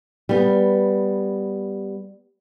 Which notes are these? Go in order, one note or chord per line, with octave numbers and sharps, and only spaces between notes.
G3 B3